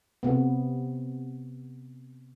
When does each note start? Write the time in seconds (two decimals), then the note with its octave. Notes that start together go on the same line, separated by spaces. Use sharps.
0.23 C3 B3